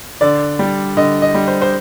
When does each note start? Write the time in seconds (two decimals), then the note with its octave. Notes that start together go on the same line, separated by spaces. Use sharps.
0.21 D3 D5
0.59 G3
0.97 D3 D#5
1.22 D#5
1.34 G3
1.48 C5
1.62 C5